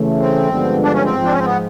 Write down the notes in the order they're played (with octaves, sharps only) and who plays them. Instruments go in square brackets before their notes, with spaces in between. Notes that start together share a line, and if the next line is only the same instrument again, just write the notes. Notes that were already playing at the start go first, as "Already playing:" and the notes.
Already playing: [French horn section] C#3 E3 A3
[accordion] C4
[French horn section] G2 D3 F3 G#3 B3
[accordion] D4
C#4
C4
[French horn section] G#2 F3 G#3
[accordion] D4
C#4
C4
B3